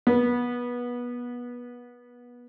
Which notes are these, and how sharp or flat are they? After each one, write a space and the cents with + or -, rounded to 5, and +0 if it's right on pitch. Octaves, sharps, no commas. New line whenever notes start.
B3 -20